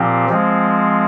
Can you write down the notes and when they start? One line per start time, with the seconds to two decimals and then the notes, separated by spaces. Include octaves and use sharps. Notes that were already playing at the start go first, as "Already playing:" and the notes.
Already playing: A#2 F3 C4 G4
0.29 F3 G#3 C4